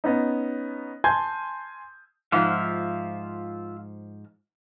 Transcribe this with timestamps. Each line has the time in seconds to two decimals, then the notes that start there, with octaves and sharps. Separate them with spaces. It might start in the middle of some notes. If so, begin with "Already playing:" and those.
0.04 B3 C#4 D#4
1.04 G#5 A5 C6 G6 G#6
2.32 G#2 F3 F4 E5 F5